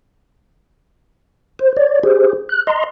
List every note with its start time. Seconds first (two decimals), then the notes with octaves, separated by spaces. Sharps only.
1.59 C5
1.77 C#5 D5
2.03 G4 G#4 C5
2.49 F#6
2.67 D#5 A#5 C6